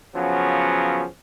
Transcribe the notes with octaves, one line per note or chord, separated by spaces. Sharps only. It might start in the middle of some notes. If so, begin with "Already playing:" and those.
C#3 F3 F#3 B3 C#4